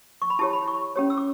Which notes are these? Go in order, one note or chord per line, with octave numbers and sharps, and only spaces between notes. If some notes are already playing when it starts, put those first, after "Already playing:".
C#6
B5
E4 G4 C#5 A5
B5
C#6
C#4 G4 C#5
E6
D6